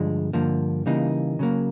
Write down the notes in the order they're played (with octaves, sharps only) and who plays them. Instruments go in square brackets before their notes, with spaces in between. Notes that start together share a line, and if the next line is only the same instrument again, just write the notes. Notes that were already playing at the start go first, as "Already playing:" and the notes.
Already playing: [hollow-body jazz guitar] G2 D3 F3 G#3
G2 D3 F3 A#3
C#3 E3 G3 A#3 D#4
C#3 F#3 A#3